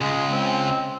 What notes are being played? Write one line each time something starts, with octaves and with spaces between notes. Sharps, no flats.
C#2 G#3
C4